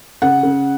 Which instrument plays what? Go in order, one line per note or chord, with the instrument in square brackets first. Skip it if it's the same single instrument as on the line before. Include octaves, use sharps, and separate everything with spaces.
[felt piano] C#3 F#5
C#3